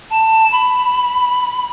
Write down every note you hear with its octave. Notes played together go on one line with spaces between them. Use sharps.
A5
B5